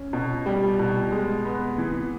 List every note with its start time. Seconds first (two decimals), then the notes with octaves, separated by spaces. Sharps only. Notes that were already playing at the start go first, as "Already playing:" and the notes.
Already playing: C#4
0.13 B2
0.46 G3
0.79 B2
1.12 G#3
1.45 B3
1.78 E3